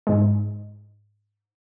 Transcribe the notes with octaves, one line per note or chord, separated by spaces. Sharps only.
G#2 G#3